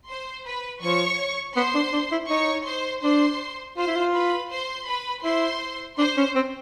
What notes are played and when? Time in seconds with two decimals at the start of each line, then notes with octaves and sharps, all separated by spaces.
0.08 C5 C6
0.46 B4 B5
0.82 F3 C#5 C#6
1.56 B3 C5 C6
1.74 D4
1.93 D4
2.12 E4
2.30 D#4 C#5 C#6
2.67 C5 C6
3.03 D4 C5 C6
3.77 F4 C5 C6
3.87 E4
3.96 F4
4.14 B4 B5
4.50 C5 C6
4.88 B4 B5
5.24 E4 C5 C6
5.98 D4 C5 C6
6.17 C#4
6.35 C4